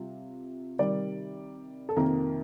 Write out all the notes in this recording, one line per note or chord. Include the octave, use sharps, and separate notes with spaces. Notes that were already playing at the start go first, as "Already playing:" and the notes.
Already playing: C3 G3 F4
C3 D#3 G3 D5
A4
F2 C3 D#3 A#3 A#4